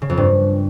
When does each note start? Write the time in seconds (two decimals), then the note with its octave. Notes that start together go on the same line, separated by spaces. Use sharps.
0.02 C#3
0.10 F2
0.17 G2